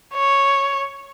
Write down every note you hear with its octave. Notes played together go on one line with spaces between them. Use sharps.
C#5